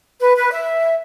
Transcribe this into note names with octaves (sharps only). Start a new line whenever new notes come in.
B4
B4
E5